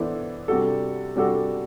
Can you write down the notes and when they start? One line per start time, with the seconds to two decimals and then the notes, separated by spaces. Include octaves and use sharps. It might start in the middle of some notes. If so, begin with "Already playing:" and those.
Already playing: E3 B3 D4 A4 C5
0.48 C3 G3 D4 F#4 A4
1.16 C3 G3 D4 F#4 A4